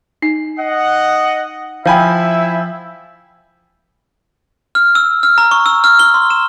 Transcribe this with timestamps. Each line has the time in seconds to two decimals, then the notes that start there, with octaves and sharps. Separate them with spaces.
0.22 D#4 C7
0.59 D#5 F#5
1.86 F3 E4 E5 F5 G5 G#5 B5
4.75 F6
4.95 E6
5.23 F6
5.38 A#5
5.51 C#6
5.66 E6
5.84 F6
5.99 G7
6.14 C6
6.30 E7